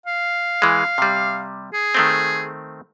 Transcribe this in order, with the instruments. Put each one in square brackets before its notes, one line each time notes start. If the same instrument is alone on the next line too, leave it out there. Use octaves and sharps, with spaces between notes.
[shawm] F5
[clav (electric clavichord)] E3 G#3
C3 G3
[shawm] G#4
[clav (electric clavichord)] D#3 A3 C4